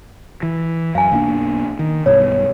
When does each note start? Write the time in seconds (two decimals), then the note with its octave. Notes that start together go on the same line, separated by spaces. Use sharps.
0.43 E3
0.95 F#2 F5 G#5
1.12 B1 A#3 D4
1.79 D#3
2.06 B1 G2 B2 C#5